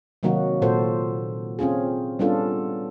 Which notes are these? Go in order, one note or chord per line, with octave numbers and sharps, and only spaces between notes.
C3 D#3 F#3 A#3 D#4 F#4
A#2 F#4 A4 C5
C4 C#4 F4 G#4
G3 B3 C#4 D4 F4 A4